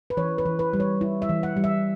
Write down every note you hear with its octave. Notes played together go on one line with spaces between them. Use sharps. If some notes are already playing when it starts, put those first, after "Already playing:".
B4
E3 C#5
B4
E3
B4
G3
C#5
E4
E5
E3
F#5
G3
E5